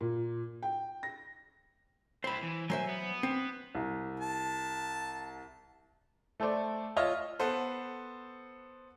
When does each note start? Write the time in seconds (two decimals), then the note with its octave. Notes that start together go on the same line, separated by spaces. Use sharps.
0.01 A#2
0.63 G5
1.03 A#6
2.24 C4 E4 C5 B5
2.42 E3
2.70 F#3 C5 E5 G#5
2.89 B3
3.23 C4
3.75 C2
4.20 A5
6.40 A3 A4 C5 D5
6.96 F4 C#5 D#5 E5 F6
7.40 B3 A4 C5